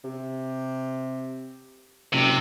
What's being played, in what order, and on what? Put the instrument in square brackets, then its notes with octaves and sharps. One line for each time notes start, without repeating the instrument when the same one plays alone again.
[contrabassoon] C3
[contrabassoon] F#1 [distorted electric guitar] C3